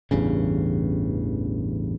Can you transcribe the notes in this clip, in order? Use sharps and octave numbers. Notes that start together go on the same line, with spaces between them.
A1 E2 G2 C#3